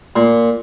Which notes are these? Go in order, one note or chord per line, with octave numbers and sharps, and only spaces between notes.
A#2